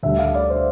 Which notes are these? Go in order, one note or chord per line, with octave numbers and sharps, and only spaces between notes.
D2 D3 G3 E5
F5
D5
C5